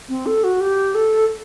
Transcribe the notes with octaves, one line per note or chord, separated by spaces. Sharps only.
C4
A4
F#4
G4
A4